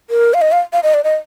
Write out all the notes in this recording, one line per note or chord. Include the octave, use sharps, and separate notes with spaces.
A#4
F5
D#5
F5
F5
D#5
D5
D#5